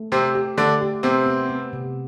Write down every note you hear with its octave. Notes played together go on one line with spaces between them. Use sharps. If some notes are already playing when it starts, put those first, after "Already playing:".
Already playing: A3
C3 C4 G4
G4
D3 A3 D4
G4
C3 B3 C4
B3
B3
C3